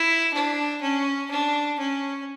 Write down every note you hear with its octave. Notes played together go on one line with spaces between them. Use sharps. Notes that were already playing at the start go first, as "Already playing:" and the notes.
Already playing: E4
D4
C#4
D4
C#4